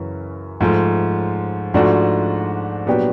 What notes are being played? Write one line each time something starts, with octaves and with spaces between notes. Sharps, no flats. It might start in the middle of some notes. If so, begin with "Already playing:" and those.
Already playing: F#2 C#3 E3
G#2 F3 A3
G#2 F3 A3 D4 F#4
A#2 F#3 B3 D4 G4